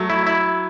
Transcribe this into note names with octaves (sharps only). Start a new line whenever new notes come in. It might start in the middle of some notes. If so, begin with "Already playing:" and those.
Already playing: F#3 A3
E4
E4